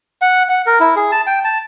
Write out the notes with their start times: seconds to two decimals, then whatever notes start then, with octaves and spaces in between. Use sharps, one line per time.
0.22 F#5
0.49 F#5
0.66 A#4
0.80 E4
0.96 G#4
1.12 A5
1.27 G5
1.44 A5